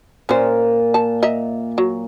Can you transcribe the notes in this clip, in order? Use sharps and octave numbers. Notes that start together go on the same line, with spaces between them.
A#2 C#4 C5
A5
D#5 E5 A#5
F#3